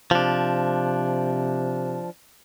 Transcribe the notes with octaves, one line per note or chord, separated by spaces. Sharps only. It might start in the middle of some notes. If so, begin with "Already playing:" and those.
C3 F3 D4